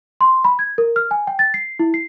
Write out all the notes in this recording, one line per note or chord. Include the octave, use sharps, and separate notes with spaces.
C6
B5
G#6
A#4
F6
G#5
G5
A6
C7
E4
C7